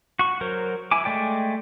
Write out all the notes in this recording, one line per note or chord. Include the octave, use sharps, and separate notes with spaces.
F#4 C#6
F#3 A#4 C5
E4 G#5 D6
G#3 A3 D5 G5